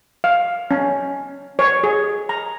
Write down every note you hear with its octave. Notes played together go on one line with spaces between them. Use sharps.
F5
C#4
C#5
G#4
A#5